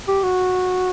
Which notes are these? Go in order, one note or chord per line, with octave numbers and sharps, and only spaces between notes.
G4
F#4